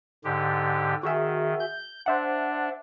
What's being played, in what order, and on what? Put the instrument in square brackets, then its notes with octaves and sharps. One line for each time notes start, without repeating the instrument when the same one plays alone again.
[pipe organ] G#2 D3 G4
[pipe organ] D#3 [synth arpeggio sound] F#4 G#4 E5
[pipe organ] G6
[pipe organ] D4 [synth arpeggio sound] C5 E5 F#5